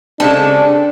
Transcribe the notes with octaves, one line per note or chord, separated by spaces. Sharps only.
C#3 G#3 C4 D4 G4 A4